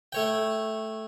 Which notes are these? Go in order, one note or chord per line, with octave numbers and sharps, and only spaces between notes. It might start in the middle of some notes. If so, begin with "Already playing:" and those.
A3 C#5 G5